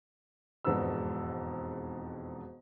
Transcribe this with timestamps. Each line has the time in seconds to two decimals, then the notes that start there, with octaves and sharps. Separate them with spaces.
0.65 E1 F2 G#2 D4 B4 E6